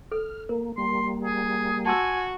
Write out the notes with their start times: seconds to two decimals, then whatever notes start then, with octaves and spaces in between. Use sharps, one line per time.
0.12 A4 F6
0.49 A#3 A#4
0.78 G3 A#3 C6
1.24 G#4
1.86 F#4 G#5 A5 C6 E6